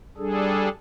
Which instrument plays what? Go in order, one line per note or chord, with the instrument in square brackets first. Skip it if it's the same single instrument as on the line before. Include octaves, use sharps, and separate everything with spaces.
[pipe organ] G3 D4 G#4 A4